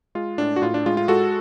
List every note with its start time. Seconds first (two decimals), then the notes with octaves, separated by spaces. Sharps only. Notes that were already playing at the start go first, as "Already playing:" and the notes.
0.15 G#3 F4
0.38 A2 D4
0.56 F#4
0.62 A2 F4
0.74 D4
0.86 G#3 F4
0.97 F4
1.08 G#3 F#4 A4